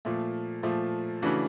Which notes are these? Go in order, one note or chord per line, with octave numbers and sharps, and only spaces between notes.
A#2 F3 A3
A#2 F3 A3
C#3 E3 A3 D4 F#4